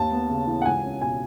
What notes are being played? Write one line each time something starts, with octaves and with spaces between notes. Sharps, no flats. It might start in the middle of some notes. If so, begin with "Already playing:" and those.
Already playing: D#2 A5
B3
C#3
E3
F#5
C#2 G#5
C#4
B2 G#5